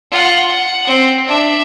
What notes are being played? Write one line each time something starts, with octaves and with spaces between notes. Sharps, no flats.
F4 F#5
F#5
C4
D4 E5